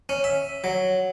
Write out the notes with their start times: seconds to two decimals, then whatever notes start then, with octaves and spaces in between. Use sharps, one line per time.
0.09 C#4
0.24 E5
0.64 F#3